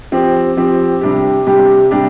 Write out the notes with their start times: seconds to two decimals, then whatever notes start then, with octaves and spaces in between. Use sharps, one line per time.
0.12 F3 C4 G4
0.57 F3 C4 G4
1.01 C3 G3 D4 G4
1.47 C3 G3 D4 G4
1.91 C3 G3 D4 G4